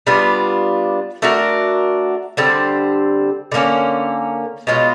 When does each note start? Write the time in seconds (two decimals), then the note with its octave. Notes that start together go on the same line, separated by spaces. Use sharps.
0.07 G3 B3 D4 F4
1.22 A3 D4 F#4 A#4
2.37 D3 G3 C4
3.52 D3 F#3 A#3 C#4
4.67 B2 G#3 C#4 F4